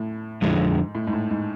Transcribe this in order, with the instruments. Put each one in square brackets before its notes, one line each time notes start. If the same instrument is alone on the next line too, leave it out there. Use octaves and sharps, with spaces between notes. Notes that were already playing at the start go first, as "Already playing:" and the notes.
Already playing: [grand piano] A2
[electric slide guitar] F2 D3 G#3 [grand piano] G#2
[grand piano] A2
G#2
A2
G#2